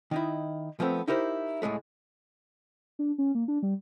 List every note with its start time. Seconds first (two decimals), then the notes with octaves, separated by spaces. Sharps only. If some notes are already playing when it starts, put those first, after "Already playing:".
0.11 D#3 D#4 E4
0.80 F3 A3 B3 C4
1.08 D#4 E4 G4 A#4 C5
1.62 C#2 A2 G#3 A3
2.99 D4
3.18 C#4
3.35 A#3
3.48 D4
3.63 G3